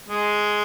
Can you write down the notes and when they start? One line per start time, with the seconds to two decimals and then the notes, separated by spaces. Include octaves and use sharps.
0.09 G#3